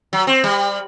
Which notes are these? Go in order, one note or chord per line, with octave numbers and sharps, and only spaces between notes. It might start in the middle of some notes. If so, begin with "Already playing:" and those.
F#3
C4
G3